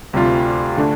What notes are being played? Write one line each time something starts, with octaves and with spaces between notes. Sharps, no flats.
D2 C3 G3 F4
D3 A3 D4